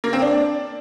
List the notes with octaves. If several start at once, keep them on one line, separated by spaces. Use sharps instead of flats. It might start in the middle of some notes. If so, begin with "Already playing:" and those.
A#3
C4
D4